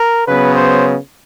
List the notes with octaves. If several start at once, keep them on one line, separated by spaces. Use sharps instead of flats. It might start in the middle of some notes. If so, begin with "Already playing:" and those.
Already playing: A#4
C#3 F#3 B3 B4
C5